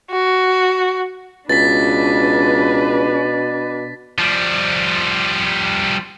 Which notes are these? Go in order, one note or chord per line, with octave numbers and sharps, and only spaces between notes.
F#4
C#2 B2 D4 B4 A6 B6
F3 G3